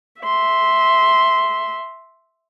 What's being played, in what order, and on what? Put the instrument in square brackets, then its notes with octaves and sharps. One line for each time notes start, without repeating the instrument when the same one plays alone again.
[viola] E5 C6